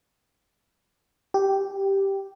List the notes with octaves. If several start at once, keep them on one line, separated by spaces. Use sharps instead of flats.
G4